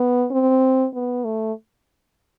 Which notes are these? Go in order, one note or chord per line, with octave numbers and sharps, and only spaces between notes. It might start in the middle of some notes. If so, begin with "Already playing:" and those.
Already playing: B3
C4
B3
A3